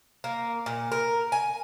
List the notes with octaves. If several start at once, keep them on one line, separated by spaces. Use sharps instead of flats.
A#3
A#2
A#4
G#5